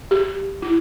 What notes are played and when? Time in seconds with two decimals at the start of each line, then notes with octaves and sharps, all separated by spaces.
0.11 G4
0.62 E4